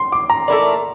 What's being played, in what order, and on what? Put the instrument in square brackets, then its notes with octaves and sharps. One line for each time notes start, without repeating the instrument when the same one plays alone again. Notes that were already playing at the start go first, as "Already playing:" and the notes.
Already playing: [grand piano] C6
D6
A#5
[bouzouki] A3 E4 A#4 D5